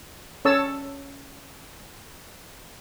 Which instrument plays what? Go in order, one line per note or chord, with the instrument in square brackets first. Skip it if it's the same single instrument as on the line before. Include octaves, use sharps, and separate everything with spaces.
[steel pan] C#4 A4 C#5 A5 E6